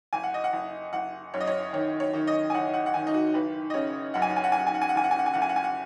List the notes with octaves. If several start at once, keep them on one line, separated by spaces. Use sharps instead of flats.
F#1 G#5
F#5
D#5
F#5
F#1
F#1 F#5
F#2 C#5
D#5
C#5
D#3 C#5
C#5
D#3
D#5
G#5
F#1 F#5
F#5
F#5
D#3 G#5
D#4
F#4
F#1 B4
D#5
C#3 C#5
F#2 F#5
G#5
F#5
G#5
F#5
G#5
F#2 F#5
G#5
F#5
G#5
F#5
F#1 G#5
F#5
G#5
F#5
G#5
F#1 F#5
G#5
F#5
G#5
F#5